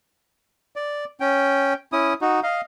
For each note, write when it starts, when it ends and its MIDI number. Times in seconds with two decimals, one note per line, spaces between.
0.76 1.05 74
1.20 1.74 61
1.20 1.74 79
1.92 2.14 61
1.92 2.14 64
1.92 2.14 87
2.21 2.40 63
2.21 2.40 66
2.43 2.61 75
2.43 2.61 77